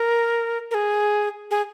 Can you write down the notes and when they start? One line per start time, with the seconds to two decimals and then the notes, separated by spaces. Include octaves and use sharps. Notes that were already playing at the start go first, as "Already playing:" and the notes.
Already playing: A#4
0.71 A#4
0.74 G#4
1.51 G#4